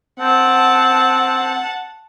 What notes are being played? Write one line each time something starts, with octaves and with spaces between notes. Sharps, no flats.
C4 F#5 A5